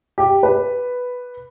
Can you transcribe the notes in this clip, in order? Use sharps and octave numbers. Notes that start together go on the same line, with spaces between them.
G4
B4